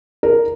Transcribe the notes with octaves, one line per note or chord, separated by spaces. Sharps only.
A#4